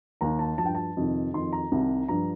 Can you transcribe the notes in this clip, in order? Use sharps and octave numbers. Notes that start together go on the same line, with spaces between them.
D#2 D#3 A#5
A5
F3 A5
G2 G5
A5
F2 C3 D#3
F2 D#3 C6
A#5
C2 C3 D#3
G2 F3 A#5